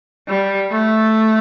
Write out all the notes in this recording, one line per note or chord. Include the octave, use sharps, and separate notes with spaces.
G3
A3